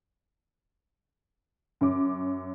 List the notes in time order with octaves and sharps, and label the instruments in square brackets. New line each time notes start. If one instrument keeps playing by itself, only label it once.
[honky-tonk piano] F#2 C#4 D6